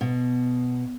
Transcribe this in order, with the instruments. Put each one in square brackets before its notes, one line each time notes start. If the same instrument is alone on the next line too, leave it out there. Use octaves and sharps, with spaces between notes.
[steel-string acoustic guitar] B2